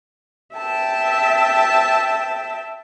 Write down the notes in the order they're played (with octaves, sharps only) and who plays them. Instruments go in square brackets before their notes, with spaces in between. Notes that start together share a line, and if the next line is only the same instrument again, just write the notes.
[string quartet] E5 G5 A5